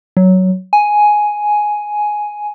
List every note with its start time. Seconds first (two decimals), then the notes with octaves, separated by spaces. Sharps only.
0.17 F#3
0.73 G#5